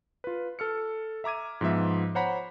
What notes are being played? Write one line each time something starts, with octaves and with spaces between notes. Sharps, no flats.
F4 B4
A4 F6 C#7
E5 A#5 D6 G#6 D#7
G#2 F3 B3 E5
C5 C#5 F#5 A#5 B5 B6